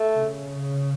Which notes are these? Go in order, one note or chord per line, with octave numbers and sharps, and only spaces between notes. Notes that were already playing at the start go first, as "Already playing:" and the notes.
Already playing: A3
C#3